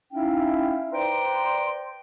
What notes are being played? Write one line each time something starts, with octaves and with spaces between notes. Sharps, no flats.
C#4 D#4 E4 E5 F5 G5
B4 C5 D5 G5 A#5 C6